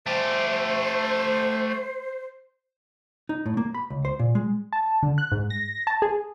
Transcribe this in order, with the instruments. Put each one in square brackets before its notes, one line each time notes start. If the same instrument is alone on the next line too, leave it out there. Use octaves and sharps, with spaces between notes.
[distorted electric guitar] A3 G4 [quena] C5
[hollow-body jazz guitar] D#4
A2
A#3
B5
C#2
C5
A#2
G#3
[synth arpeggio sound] A5
D3
F#6
G#2
A#6
A5
G#4